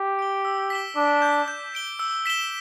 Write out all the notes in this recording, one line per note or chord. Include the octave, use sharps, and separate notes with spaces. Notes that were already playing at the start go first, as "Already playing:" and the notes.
Already playing: G4
D7 G7
E6
B6 E7 G7
D4 D6
G6 B6
G6
B6 D7 G7
E6
B6 E7 G7